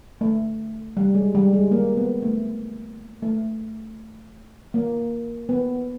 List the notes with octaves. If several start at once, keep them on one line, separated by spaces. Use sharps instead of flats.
A3
G3
G#3
G3
G#3
A#3
B3
A3
A3
A#3
B3